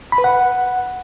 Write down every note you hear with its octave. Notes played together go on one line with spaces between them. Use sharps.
B5
B4
F#5